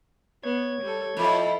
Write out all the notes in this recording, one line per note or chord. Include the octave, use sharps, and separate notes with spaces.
B3 C#5 G#6
G3 A4
F2 E4 F4 A4